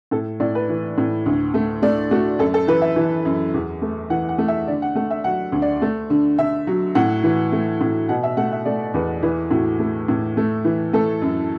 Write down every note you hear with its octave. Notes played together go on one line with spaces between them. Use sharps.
A2 A4
A2 D5
B4
E3
A2
D2
A3
A3 D5
A3 F#4
F#2 A4
A4
E3 B4
E5
E3
F#2
E2
A3
E3 F#5
F#5
A3
E5
D3 D5
F#5
A3 F#5
E5
F#3 F#5
D2
D5
A3
D3
D3 E5
F#3
A2 F#5
E3
A3
A2
B2 F#5
E5
A3 F#5
E5
A3 D5
E2 B4
E3 B4
A2 F#4
A3
A2
A3
E3
A3 A4
F#2